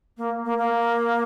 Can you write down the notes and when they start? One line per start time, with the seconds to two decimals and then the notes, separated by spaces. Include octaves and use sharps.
0.17 A#3
0.45 A#3
0.58 A#3